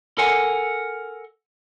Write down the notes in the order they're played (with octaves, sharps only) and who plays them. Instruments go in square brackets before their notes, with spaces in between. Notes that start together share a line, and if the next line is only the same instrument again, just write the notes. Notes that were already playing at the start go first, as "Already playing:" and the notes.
[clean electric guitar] A4 A#4 F#5 G#5